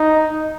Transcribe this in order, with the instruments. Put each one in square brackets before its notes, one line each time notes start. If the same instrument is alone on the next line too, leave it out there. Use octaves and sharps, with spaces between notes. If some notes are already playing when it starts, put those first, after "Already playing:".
Already playing: [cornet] D#4